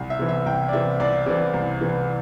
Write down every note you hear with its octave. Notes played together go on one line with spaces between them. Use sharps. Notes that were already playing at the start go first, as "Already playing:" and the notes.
Already playing: C2
E5
C3 E3
E5
C2 G5
D5
C3 E3 E5
C2 D5
C3 E3 D5
C2
C3 E3